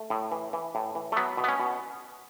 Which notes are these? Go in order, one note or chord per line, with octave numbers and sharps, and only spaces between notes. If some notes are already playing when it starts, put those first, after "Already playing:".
Already playing: A3
A2
E3
E3
A2
E3
A3
F#3 B3
B2
B3
C#4
B2